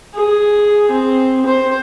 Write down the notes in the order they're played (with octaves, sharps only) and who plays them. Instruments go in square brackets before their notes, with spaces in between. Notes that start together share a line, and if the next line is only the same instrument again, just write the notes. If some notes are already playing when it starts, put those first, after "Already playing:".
[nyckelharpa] G#4
C4
C5